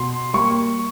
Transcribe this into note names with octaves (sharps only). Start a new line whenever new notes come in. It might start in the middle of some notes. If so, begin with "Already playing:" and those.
Already playing: B2 C6
G3 A#3 C#6